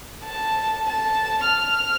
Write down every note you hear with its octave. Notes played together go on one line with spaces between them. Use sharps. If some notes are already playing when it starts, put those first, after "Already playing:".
A5
A5
F6